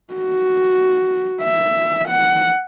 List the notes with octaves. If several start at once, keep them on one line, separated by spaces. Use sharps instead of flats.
F#4
E5
F#5